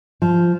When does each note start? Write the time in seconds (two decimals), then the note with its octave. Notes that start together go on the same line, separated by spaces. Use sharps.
0.22 F3